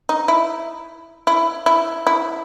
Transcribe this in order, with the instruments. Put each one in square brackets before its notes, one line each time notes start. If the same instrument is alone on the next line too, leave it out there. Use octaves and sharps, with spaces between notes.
[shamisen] D#4
E4
E4
E4
E4